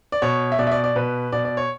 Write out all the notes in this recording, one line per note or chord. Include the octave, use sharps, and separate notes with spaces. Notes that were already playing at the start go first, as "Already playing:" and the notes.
D5
B2 C#5
E5
B2 D5
E5
D5
D5
B2 B4
B2 D5
D5
C#5